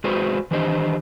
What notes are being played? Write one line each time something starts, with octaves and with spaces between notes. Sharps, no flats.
G#3 F#4 G#4 B4 C5
D#3 E3 D4 G4 C5 D#5